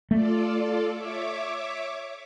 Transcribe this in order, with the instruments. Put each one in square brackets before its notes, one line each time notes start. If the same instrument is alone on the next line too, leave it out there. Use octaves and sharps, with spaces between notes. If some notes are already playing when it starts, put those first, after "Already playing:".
[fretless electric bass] A3 [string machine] F4 A4 D5
[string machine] C#5 E5 D6